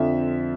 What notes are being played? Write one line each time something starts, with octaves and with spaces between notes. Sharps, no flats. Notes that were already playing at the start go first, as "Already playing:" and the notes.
Already playing: F2 D3 F3 E5